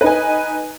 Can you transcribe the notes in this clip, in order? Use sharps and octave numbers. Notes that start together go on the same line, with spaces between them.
D#4 B4 G#5